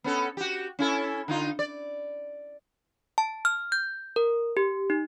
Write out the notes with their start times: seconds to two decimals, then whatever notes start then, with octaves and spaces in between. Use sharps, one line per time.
0.04 B3 C#4 A4
0.37 F#4 G4
0.79 C#4 E4 A4
1.28 D3 D#4 F4
1.59 D5
3.18 A5
3.45 F6
3.72 G6
4.16 A#4
4.57 G4
4.90 D#4